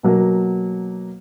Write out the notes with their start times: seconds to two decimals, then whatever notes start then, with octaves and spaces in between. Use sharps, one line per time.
0.03 B2 F#3 A#3